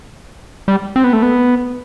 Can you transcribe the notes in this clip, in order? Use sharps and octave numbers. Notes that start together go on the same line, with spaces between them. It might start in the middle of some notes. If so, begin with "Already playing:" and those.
G3
C4
B3
A3
B3